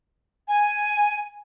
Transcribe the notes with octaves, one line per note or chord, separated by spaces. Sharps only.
G#5